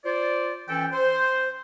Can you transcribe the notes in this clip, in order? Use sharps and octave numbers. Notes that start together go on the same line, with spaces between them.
F4 C5 D5
E3 C#4 A4 G5
C5